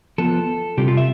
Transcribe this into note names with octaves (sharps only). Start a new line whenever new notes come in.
F3 B3 F4 A4
C3 G3 C4 F4 G4
F4
E5